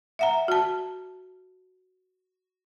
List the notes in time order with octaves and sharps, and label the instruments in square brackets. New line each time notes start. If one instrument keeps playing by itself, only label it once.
[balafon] E5 F#5 A#5
F#4 A5